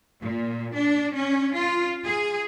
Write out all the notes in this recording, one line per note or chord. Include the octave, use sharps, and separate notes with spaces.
A#2
D4
C#4
F4
G#4